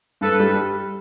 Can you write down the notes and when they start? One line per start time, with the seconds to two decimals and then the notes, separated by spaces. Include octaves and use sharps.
0.21 G2 A4 B4
0.40 G3